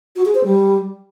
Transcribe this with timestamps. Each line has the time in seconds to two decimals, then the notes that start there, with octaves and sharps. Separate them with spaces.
0.16 F#4
0.25 G#4
0.35 C5
0.44 G3